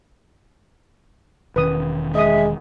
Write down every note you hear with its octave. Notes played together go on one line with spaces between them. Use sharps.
E1 D#3 C#4 B4 D#6
G#3 D#5 E5 D#6